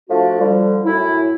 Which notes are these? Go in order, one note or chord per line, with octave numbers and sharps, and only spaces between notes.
F3 A3 D4 F4 F#4
D3 F3 G3
F#2 A2 E4